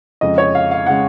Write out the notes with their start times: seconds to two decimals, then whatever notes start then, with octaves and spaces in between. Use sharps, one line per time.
0.21 F2 C#3 G#3 D#5
0.38 C#5
0.55 F5
0.71 F5
0.86 C#3 G#3 F#5